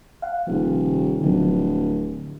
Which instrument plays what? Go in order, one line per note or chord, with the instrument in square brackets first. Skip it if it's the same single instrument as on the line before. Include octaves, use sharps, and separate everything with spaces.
[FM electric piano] F5 F#5
[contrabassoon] D#1 [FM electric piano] C3 F3
[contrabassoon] D1 [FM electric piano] D3 F3 F#3